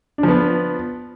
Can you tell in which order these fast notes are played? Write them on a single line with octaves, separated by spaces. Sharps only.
D4 F3 B3